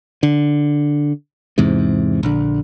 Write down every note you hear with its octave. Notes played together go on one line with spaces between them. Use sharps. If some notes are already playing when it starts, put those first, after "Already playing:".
D3
E2 G#2 C3
A#1 D3